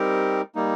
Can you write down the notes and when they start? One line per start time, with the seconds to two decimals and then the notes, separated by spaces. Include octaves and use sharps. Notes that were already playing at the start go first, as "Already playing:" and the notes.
Already playing: G3 C4 D#4 G4 A#4
0.55 G3 A#3 D#4